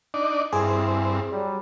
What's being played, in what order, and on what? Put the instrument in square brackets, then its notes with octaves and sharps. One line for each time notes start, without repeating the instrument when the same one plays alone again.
[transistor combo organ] D4 D#4 D5
[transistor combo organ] G2 C4 [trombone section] E4 [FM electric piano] G#4
[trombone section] F#3 G3